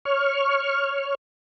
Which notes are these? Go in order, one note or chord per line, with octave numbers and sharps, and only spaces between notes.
C#5 C#6 F6